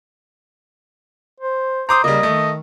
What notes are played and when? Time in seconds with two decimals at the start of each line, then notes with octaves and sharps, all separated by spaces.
1.40 C5
1.89 C5 A#5 D6 D#6
2.04 C#3 G3 A#3 D#5
2.23 D#3 A3